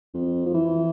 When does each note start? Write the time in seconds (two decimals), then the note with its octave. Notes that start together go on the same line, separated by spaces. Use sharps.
0.14 F2
0.46 F3
0.55 E3